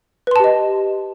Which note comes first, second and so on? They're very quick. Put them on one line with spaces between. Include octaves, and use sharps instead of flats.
B4 C6 A5 G4 D#5